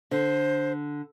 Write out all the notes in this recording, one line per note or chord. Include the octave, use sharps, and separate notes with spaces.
D3 C5